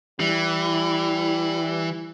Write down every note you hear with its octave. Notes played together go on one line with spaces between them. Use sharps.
E3 G3